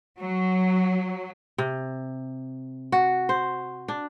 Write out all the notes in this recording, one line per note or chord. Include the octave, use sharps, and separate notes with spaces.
F#3
C3
F#4
C5
D4